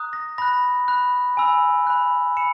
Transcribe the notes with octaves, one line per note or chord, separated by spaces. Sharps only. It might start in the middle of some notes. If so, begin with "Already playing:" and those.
Already playing: A#5 D#6 F#6
A#6
B5 F#6 A#6
B5 F#6
G#5 B5 E6
B5 F#6
B5 C#7 E7